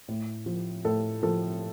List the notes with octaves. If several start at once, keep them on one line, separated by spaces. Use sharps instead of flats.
A2
F3
A2 A4
F3 A4